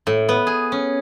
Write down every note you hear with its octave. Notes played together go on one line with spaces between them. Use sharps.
A2
B3
G#4
C#4